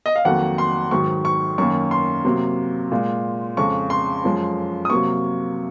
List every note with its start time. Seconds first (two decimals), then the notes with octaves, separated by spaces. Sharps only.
0.06 D#5
0.16 F5
0.25 F2 D#3 F#3 A#3 F#5
0.58 C6
0.91 G#2 D#3 F#3 C#6
1.25 C#6
1.58 F#2 D#3 A#3 C#6
1.91 C6
2.25 C3 F#3 A#3
2.92 A#2 G#3
3.57 F2 C#3 G#3 C#6
3.90 C6
4.24 F#2 F3 G#3
4.85 D#6
4.90 C3 F#3 A#3 C#6